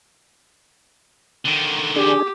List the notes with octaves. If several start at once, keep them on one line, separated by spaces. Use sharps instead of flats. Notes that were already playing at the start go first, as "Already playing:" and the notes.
D3 D#3
D4 G4 G#4